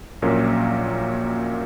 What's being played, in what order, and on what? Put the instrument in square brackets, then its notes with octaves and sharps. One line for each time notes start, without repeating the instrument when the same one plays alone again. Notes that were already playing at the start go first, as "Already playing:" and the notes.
[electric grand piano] A#1 A#2 F#3 A#3 C#4